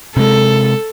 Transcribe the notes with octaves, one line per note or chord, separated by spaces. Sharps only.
C3 G#3 A4